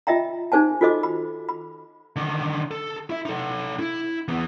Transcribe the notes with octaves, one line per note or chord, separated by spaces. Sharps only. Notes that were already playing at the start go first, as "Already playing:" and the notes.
F4 D#5 E5 G5 A#5
D#4 G#4 C5 G#5 A5
F4 F#4 A4 C5 D#5 D6
B5
B5
D3 D#3
A4
E4 E5
D#4 A4
E4
E3 B3